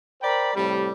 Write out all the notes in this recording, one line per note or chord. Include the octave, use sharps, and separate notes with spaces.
A#4 C5 D5 G5 B5
A2 C3 G3